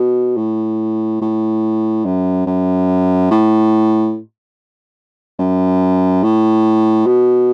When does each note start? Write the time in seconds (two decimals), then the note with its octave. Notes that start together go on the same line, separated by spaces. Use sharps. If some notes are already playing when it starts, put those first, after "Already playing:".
Already playing: B2
0.37 A2
1.21 A2
2.05 F#2
2.46 F#2
3.31 A2
5.39 F#2
6.23 A2
7.06 B2